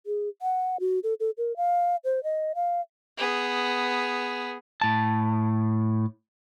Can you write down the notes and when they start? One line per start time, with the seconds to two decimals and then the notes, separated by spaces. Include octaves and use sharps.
0.06 G#4
0.42 F#5
0.80 F#4
1.04 A4
1.20 A4
1.38 A#4
1.57 F5
2.04 C5
2.24 D#5
2.55 F5
3.17 B3 G#4
4.81 A2 A5